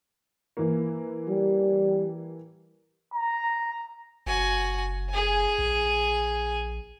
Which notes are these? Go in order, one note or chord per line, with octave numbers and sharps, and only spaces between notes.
E3 A#3
G3
A#5
F#1 F#4 G#5
G#4 G#5
A#1